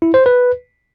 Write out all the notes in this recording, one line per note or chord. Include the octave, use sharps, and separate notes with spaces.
E4
C5
B4